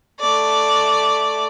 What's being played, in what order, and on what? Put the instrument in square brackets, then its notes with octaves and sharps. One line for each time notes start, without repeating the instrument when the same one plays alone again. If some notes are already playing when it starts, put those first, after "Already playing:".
[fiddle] A3 D5